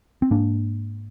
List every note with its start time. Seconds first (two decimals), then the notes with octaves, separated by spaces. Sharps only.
0.22 C4
0.31 G#2 A#3 D4